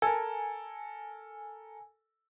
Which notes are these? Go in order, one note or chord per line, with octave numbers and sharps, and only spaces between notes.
A4 A#4 G#5